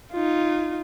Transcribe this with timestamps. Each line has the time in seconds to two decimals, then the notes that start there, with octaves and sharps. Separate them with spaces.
0.12 D#4 F4